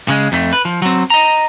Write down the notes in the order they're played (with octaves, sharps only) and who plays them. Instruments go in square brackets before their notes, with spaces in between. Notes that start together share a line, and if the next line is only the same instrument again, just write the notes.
[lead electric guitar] C#3 G#3
F2 A3
B4
F3
F#3 C4
D#5 A#5